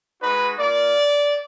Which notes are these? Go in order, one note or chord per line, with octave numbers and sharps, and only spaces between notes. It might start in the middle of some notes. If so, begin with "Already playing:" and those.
G#3 D#4 F#4 B4
A#3 F4 D5